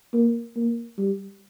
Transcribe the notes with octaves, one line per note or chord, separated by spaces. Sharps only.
A#3
A#3
G3